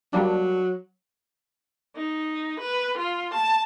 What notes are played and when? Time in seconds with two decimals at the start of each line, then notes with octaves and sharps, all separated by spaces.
0.13 F#3 G3 A#3 D4
1.97 D#4
2.61 B4
2.98 F4
3.34 A5